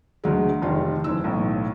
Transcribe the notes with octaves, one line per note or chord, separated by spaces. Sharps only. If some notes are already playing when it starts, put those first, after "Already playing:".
D2 F#3 G#3
F1 D#3 F4
F#1 E3 E6
B1 A2